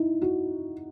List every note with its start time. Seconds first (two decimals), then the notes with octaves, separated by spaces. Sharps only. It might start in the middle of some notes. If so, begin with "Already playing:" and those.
Already playing: D#4 E4
0.22 F#4